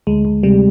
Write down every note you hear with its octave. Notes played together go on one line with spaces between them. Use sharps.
D2 G#3
D2
C3 G3